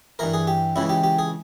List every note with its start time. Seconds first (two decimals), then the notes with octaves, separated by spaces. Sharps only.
0.19 G2 E3 A#4
0.34 G#4
0.47 G4
0.76 C#2 C#3 E3 E4
0.89 G4
1.04 G4
1.19 G#4